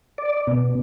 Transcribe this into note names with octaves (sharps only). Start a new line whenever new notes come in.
D5
B2